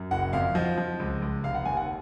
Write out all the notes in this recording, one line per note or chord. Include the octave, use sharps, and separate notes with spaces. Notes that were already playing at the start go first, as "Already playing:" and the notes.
Already playing: F#2
F#1 F#5
F2 F5
F3 D#5
F3
C#2
C#2
F1 F5
F#5
D#2 G#5
F#5